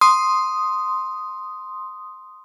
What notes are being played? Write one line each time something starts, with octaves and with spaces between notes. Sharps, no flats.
C6 D#6